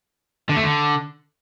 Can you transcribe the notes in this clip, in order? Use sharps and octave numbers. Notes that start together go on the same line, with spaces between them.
D3
A3
D3